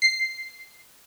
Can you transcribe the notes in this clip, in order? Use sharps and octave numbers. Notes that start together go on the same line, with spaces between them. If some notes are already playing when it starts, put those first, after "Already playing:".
C7